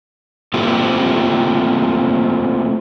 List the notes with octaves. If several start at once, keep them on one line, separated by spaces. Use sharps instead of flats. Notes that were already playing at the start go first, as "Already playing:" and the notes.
A3 A#3 C4 E4 F4 G4